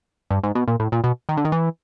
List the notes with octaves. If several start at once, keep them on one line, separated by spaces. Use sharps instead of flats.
G2
G#2
B2
A#2
A2
A#2
B2
D#3
D3
D#3
E3